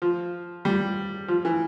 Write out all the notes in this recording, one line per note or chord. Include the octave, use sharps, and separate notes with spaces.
F3
G3
F3
E3